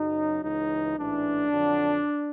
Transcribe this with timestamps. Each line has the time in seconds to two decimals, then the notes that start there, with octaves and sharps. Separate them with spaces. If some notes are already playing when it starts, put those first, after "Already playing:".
Already playing: F#2 C#3 F#3 D#4
0.41 C#2 C#3 E3 D#4
0.95 A1 G#2 E3 D4
1.50 F2 D3 F#3